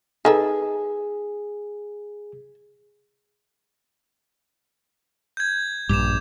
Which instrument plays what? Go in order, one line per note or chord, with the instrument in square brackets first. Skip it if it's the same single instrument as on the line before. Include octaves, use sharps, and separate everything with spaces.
[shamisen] D#4 A4 B4 [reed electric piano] G#4
[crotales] G6 G#6
[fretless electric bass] A#1 G2 [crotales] D6 E7